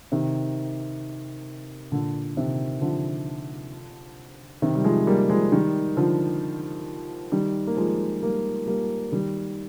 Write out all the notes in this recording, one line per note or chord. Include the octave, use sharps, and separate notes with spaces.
C3 D#3
A#2 D3
C3 D#3
D3 F3
C3 D#3
G3
F3 G#3
G3 A#3
F3 G#3
D#3 G3
D3 F3
D#3 G3
A#3
F3 G#3
G3 A#3
G3 A#3
D#3 G3